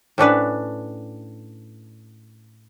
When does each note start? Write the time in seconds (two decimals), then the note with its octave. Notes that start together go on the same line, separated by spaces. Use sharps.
0.18 A2 C#4 D4 B4